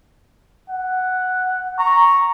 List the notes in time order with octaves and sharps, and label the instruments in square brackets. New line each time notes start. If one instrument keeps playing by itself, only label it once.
[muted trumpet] F#5
[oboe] A#5 [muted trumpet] C#6